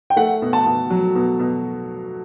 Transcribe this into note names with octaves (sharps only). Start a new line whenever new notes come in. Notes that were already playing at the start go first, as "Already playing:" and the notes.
G5
A3 F#5
B2
A5
B2
F#3
B2
B2